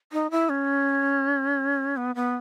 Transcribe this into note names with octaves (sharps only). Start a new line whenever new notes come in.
D#4
E4
C#4
B3
B3